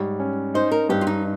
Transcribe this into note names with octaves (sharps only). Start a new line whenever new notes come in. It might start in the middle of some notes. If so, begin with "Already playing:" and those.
Already playing: G#2 G3 C#5
C#4
D#4 C5
A#4
G2 G4
F4
D#4